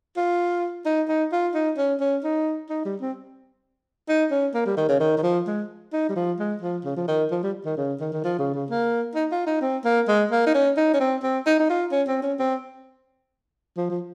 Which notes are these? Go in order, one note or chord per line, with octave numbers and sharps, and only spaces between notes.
F4
D#4
D#4
F4
D#4
C#4
C#4
D#4
D#4
G3
C4
D#4
C#4
A#3
G3
D#3
C#3
D#3
D#3
F3
G#3
D#4
G3
F3
G#3
F3
C#3
F3
D#3
F3
G3
D#3
C#3
D#3
D#3
F3
C#3
C#3
A#3
D#4
F4
D#4
C4
A#3
G#3
A#3
D#4
C#4
D#4
C#4
C4
C4
D#4
D#4
F4
C#4
C4
C#4
C4
F3
F3